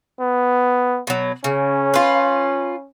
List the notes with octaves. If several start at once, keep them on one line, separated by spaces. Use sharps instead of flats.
B3
B2 F#3
C#3 C#4
F4 B4